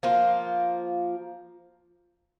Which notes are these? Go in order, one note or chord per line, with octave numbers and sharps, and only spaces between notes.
F3 A#3 F4